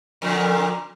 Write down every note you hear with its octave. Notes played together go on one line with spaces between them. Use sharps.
F2 A#2 D3